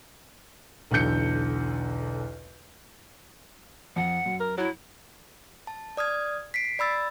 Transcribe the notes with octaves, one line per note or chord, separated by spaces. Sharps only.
B1 E2 D3 A4 G6 C#7
F2 F#5
F#2
A#4
F#3 E4
A5
D5 D#6 F6 G#6
B6 C7 D7
D5 B5 E6 A6